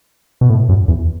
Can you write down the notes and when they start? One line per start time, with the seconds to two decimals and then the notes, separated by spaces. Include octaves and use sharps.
0.41 B2
0.50 A2
0.69 F#2
0.88 E2